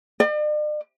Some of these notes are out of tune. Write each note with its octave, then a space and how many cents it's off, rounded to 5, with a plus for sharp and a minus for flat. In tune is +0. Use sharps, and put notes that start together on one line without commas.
D5 +45